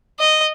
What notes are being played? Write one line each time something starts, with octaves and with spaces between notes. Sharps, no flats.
D#5